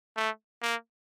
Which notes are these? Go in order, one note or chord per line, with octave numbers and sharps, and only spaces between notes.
A3
A#3